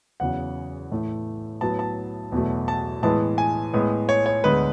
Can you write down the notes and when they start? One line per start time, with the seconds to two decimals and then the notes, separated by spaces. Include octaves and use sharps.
0.20 E2 C#3 F#3 F#5
0.92 A2 E3 A3
1.61 A2 F#3 B3 A5
1.79 A5
2.32 E2 B2 F#3 A3
2.68 A5
3.02 A2 E3 G#3 B3 A5
3.38 G#5
3.74 A2 G#3 B3
4.09 C#5
4.26 C#5
4.44 D2 D3 G#3 B3 B4